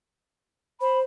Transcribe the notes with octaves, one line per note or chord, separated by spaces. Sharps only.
C5 B5